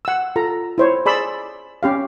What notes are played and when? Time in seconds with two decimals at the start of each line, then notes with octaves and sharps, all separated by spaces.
0.05 F#5 E6
0.36 F4 A4 A#5
0.78 E4 C5 C#5
1.06 G#4 D5 B5 C6 E6
1.83 C#4 G4 F5